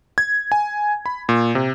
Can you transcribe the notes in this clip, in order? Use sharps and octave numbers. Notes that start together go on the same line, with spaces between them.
G#6
G#5
B5
A#2
C3